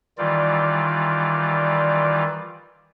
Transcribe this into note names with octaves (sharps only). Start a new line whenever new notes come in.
D#3 E3 G3 F4 D5